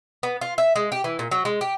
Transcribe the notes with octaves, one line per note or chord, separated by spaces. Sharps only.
B3
F4
E5
G#3
G4
E3
A#2
F#3
G#3
G4